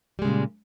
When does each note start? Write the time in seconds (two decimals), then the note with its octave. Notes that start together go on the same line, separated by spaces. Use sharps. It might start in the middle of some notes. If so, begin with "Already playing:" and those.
0.19 G3
0.22 G#3
0.25 C#3
0.28 A#2